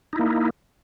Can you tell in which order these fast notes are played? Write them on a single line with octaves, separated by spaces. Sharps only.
D#4 E4 A#3